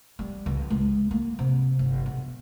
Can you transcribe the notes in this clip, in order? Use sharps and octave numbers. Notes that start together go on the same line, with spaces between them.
G3
C#2
G#3
A#3
C3
G1
B2